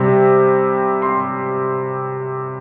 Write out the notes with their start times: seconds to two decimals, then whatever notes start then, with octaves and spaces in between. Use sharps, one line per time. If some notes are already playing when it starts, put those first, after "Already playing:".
Already playing: C3 G3 C4
1.02 C6